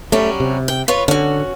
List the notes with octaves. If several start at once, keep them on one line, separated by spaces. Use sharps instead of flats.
F#3 G3 A3 C#4
C3
G5
F4 B4 C#5
D3 C#4 F#4